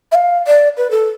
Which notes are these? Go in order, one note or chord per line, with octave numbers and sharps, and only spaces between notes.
E5
F5
D5
B4
A4